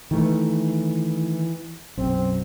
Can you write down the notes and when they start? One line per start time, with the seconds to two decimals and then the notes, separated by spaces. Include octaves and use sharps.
0.11 D#3 E3 A3
1.97 B1 F#2 C4